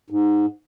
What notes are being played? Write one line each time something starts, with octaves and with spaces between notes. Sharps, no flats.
G#2